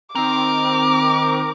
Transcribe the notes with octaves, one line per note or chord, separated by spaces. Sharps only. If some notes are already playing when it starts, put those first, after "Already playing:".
D#3 C4 A#4 D6